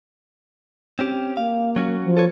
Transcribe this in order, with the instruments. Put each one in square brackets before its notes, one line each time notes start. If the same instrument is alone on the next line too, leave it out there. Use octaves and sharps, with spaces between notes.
[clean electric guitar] C4 C#4 G4
[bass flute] A#3 [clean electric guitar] F5
[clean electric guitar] F#3 C#4 F#4
[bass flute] F3
[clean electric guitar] A4 B4 C#5